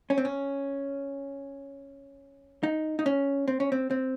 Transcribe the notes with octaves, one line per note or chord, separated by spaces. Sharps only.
C#4
C4
C#4
D#4
D#4
C#4
C4
C#4
C4
C4